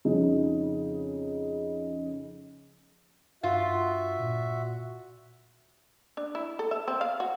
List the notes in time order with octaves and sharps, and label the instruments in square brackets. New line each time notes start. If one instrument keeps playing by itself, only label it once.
[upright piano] F2 C#3 D#4
[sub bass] G2 [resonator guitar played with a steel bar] F4 [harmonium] F#4 E5
[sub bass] A#2
[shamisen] D4
E4
A4
E5
C4
F5
F#4